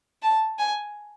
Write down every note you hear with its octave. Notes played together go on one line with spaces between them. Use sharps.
A5
G#5